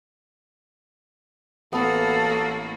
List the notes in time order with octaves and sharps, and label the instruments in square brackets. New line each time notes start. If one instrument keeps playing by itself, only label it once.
[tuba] A1 [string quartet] A#3 F#4 [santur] B3 [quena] A4